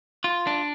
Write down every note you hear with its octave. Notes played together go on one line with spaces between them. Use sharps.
F4
D4